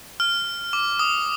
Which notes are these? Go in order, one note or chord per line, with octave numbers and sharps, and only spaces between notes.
F6
D6
D#6